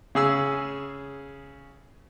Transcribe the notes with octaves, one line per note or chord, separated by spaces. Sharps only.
C#3 G#4 E6